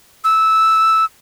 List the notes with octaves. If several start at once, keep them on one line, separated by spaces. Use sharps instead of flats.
E6